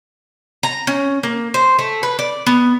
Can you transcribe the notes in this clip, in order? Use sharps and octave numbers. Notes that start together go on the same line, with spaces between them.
A#5
C#4
A#3
C5
A3
B4
D5
B3